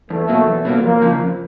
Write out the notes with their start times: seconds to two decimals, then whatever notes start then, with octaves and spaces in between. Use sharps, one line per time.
0.10 E2 A3
0.29 B2 F#3 A#3
0.47 E2
0.65 B2 F#3 A#3
0.83 F2 A#3
1.02 C#3 F3
1.19 F2